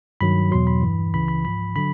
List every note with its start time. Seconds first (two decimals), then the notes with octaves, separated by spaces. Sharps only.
0.21 G2 D#3 F#3 B5
0.51 E2 B2 F#3 C6
0.67 B5
0.82 G2 E3
1.14 C#2 C#3 E3 B5
1.28 B5
1.45 G#2 F3 B5
1.76 D3 F#3 B5